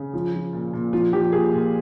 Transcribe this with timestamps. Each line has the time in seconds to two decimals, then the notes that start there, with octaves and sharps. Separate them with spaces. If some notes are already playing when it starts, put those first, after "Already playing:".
Already playing: C#3
0.13 F3
0.34 F3
0.53 A#2
0.73 A#2
0.93 F3 F4
1.13 F3 G4
1.32 A#2 G#4
1.52 A#2